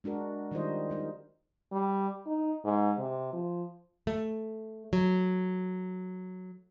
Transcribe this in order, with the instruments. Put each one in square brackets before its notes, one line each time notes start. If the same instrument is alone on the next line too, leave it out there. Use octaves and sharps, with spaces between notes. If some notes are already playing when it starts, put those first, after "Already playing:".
[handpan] G#3 D4 F#4 A#4
D#3 G3 D#4 F4 C5 D#5
G3 D#4 A#4
[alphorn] G3
D#4
G#2
C3
F3
[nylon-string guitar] A3
F#3